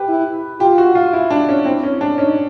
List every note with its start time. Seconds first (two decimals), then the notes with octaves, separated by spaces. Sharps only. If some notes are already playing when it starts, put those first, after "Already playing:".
Already playing: G4 B4
0.08 E4
0.60 F4 G4
0.78 F#4
0.95 F4
1.13 E4
1.30 D4
1.49 C#4
1.65 C4 E4
1.83 C#4
2.01 D4
2.18 C#4 D#4